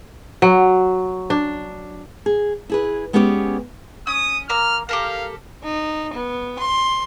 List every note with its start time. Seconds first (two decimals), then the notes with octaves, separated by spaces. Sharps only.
0.42 F#3
1.30 D4
2.26 G#4
2.70 E4 G#4 B4
3.13 G#3 B3 C#4 G4 C#5 D5
4.07 C#4 D#6
4.49 A#3 A#5 E6 F6
4.89 G4 A4 A#4 F5
5.63 D#4
6.14 B3
6.59 C6